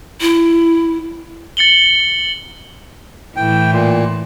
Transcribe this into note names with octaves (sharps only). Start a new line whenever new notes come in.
E4
A6 C#7 F#7 G7
A2 E3 G5
A#2